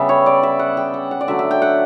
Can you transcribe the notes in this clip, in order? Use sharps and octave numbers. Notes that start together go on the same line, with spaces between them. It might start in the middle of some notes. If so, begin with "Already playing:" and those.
Already playing: C#3 G3 B3 E5
C#5
D5
E5
F#5
G5
F#5
F#5
D5
D3 F#3 A3 E5
E5
G5
F#5